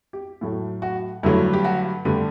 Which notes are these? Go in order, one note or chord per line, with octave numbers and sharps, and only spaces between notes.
G4
A2 F#3 A3
F#4
G2 D3 F#3 A3 E4
G4
F#4
G2 D3 A3 G4